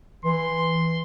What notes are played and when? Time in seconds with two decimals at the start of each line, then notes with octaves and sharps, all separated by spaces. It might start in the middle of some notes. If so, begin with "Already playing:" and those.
0.25 E3 C6